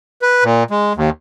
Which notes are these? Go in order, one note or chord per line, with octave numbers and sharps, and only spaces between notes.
B4
A#2
G#3
D#2